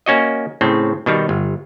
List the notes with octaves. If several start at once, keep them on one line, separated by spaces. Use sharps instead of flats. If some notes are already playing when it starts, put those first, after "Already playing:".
A#3 C#4 F#4 D#5
A2 C#3 C4
B2 D#3 G3
G1